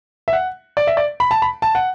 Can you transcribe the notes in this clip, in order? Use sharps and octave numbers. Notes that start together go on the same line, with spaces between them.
E5
F#5
D5
E5
D5
B5
A5
B5
A5
F#5